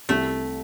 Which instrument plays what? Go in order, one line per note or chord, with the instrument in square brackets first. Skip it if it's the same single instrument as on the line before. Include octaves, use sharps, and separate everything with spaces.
[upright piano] C2 [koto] A3